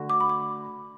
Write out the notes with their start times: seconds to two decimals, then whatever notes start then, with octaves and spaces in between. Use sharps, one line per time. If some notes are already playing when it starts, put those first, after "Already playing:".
Already playing: D3 A3 F#4
0.10 D6
0.20 B5
0.30 D6